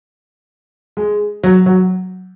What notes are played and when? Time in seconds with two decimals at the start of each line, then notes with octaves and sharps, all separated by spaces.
0.97 G#3
1.44 F#3
1.66 F#3